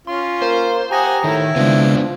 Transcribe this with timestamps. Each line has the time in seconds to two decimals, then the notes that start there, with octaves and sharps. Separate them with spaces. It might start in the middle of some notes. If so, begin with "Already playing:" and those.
0.07 C#4 F4 C6
0.42 A#3 C5
0.91 G4 F#5 G#5 A#5 D#6 A#6
1.24 A2 D#3 E4
1.56 C#3 F3 G#3 B3 C4 D4
1.95 F3